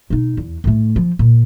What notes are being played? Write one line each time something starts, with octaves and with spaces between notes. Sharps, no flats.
B2 D#4
E2
A2 A3
F3
A#2